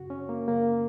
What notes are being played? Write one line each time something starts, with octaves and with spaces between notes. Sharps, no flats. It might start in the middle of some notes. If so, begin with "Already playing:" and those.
Already playing: F#2 C#3 F#4
C#4
A#3
F#2 C#3 A#3